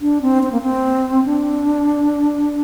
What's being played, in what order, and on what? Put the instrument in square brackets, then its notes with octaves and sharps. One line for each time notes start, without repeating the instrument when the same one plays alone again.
[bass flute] D4
C4
C4
A#3
C4
D4